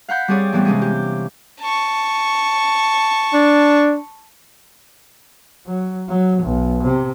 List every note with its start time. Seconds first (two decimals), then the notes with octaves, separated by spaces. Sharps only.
0.08 F5 F#5 B5 G6
0.28 G3 C4 G4 G#4 C#5 D5
0.53 A2 E3 G3 B3 C4
0.65 C3 G#3 C#4 G#4
0.82 G4
1.60 A5 C#6
3.33 D4
5.67 F#3
6.09 F#3
6.43 B1
6.83 C3